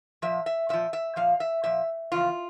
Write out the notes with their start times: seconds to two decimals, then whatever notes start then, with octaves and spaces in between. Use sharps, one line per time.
0.22 A#2 F3 E5
0.46 E5
0.69 A#2 F3 E5
0.93 E5
1.16 A#2 F3 F5
1.40 E5
1.64 A#2 F3 E5
2.12 E2 C#3 F3 F4